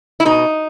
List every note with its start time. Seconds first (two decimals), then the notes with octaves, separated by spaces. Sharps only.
0.20 E4
0.25 B2 D#4